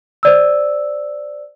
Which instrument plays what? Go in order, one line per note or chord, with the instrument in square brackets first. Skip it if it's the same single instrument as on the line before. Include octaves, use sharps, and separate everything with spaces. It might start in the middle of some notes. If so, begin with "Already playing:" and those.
[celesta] C5 D5 E6